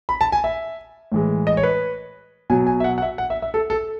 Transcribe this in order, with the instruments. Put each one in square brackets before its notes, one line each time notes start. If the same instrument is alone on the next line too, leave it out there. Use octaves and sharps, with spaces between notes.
[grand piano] B5
A5
G#5
E5
A2 E3 G#3
D#5
C#5
B4
B2 F#3 G#5
G#5
E5
F#5
F#5
E5
F#5
E5
E5
A4
A4